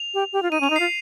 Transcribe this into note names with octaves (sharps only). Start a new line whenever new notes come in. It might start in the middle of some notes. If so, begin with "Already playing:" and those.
Already playing: F7
G4
G4
F4
D#4 D#7
C#4 F7
D#4
C7
F4